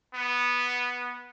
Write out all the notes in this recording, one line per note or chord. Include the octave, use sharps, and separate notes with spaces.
B3